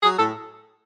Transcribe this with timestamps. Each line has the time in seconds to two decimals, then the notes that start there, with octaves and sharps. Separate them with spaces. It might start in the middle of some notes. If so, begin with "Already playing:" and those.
0.03 F#3 G#4
0.18 A2 A4